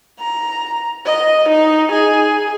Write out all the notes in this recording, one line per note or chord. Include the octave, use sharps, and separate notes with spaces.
A#5
D#5
D#4
G#4